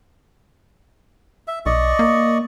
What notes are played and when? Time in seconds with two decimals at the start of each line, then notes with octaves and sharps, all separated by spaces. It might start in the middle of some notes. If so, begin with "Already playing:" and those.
1.48 E5
1.66 B1 D5 D#5 C#6
1.99 A#3